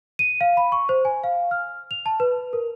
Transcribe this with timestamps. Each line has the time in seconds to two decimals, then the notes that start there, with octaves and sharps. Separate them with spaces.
0.19 D#7
0.41 F5
0.57 B5
0.72 C#6
0.89 C5
1.05 G#5
1.24 F5
1.51 F6
1.91 F7
2.06 A5
2.20 B4
2.53 A#4